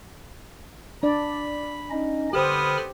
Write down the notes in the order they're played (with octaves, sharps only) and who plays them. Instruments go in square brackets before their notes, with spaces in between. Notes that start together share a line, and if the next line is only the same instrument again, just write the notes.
[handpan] D4 D5 [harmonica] B5
[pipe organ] C#4 D#4 D#5
[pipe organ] D3 B5 F6 [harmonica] B3 C4 D#6 [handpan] G4 C5